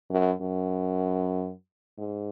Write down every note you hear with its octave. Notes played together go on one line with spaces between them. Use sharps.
F#2
F#2
G#2